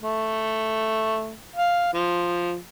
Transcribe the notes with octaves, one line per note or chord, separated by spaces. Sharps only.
A3
F5
F3